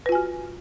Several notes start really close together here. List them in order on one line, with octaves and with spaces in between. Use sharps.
B4 F4 G#5 F#4